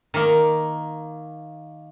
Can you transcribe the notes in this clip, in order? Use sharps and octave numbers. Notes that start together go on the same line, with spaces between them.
D#3 A#3